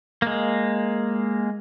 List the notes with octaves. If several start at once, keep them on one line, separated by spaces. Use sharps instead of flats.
G#3 A#3